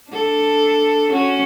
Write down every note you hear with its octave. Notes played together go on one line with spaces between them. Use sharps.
D4 A4
C#4 F#4